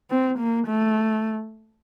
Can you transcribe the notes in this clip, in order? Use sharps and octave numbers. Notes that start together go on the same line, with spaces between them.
C4
A#3
A3